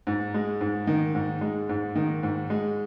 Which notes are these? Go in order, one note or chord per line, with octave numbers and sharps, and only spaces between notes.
G#2
G#3
G#2
D#3
G#2
G#3
G#2
D#3
G#2
G#3